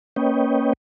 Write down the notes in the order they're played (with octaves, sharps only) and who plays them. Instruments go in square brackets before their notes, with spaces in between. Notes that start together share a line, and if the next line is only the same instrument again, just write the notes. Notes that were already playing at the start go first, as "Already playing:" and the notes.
[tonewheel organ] A#3 C#4 B4 C#5 D#5 G5